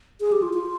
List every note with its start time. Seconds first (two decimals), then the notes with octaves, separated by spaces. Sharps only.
0.21 G#4
0.32 G4
0.42 F4
0.54 F4